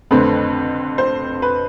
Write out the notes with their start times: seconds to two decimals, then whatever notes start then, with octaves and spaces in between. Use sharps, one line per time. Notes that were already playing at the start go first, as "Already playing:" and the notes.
0.11 F2 D3 A3 C4 B4
0.98 C5
1.42 B4